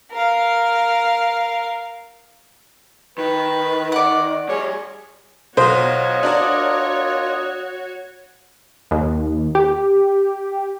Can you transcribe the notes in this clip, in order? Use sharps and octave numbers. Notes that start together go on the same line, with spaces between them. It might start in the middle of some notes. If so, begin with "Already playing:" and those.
A#4 F5
D#3 B4
D5 F#5
G3 G#4 C#5
B1 F4 F#4 C5 C#5 D#5
D4 A#4 D5
D#2
G4